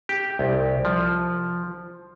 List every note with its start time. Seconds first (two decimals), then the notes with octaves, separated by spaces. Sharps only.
0.09 G4
0.39 C2
0.85 F3